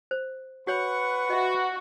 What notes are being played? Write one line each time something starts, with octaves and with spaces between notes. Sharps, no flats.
C5
F#4 B4 C#5 F#5 B5 C#6
F#4 D#5 E5